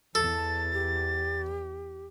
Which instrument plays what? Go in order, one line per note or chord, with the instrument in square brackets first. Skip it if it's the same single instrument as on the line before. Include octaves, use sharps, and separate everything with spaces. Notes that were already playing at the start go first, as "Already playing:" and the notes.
[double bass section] E2 [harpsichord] A4 [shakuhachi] A5 [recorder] A6
[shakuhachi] G4